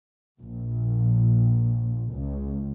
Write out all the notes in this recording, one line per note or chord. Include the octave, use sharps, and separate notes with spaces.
A#1
C#2